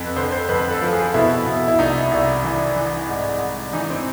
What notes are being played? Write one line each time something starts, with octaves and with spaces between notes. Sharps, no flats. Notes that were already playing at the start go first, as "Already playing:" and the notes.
Already playing: F2 B4
D3 C5
C5
F2 B4
A4
F3
G#4
B2 E4
B2
E4
C2 D#4
C2
E3
E3
G#2
G#2
E3 D#4
C4